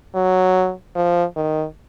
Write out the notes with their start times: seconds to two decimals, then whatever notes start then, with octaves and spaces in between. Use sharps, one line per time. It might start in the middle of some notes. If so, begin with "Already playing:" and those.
0.15 F#3
0.96 F3
1.37 D#3